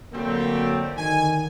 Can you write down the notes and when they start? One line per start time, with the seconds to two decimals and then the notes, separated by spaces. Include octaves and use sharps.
0.13 D3 F#3 G3 A3 A#3 C4
0.97 D3 D#3 G#5